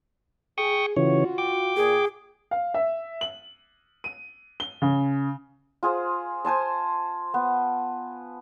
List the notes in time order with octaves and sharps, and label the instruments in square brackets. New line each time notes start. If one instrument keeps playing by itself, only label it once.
[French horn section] G#4 [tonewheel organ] G5 C#6 D#6
[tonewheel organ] C#3 E3 C#5 [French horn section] F4 F#4
[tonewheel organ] G5 D6
[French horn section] A#2 [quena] G#4
[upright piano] F5
E5
F#7
D#7
G7
C#3
[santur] F4 G#4 C5
C5 G#5 A5 C6
B3